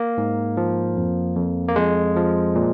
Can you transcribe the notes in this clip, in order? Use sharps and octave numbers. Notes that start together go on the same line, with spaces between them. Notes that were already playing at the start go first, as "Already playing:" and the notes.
Already playing: A#3
G#2
F3
F2
F2
A#3
F2 G#3
F3
A#2